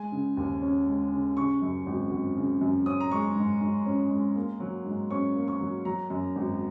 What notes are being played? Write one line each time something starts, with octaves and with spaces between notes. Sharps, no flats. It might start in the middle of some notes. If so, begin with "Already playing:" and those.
Already playing: G#3 G#5
C#3
D#2
C#4
G#3
C#3
C#3 C#6
F#2
G#1
G#1
C#3
F#2
C#4 D#6
A#5
G#3 C#6
G#2
G#2
C#4
G#3
A#3
F#3
G#2
C#4 C#6
A#3
C#6
F#3
F#3 A#5
F#2
G#1